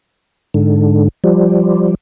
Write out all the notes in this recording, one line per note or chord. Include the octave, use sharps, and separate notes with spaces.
G#2 D3
F3 G3